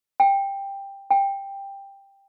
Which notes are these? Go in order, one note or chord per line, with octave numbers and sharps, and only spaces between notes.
G5
G5